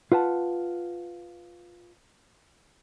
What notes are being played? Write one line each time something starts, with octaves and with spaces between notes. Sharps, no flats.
F4 B4 F#5 A5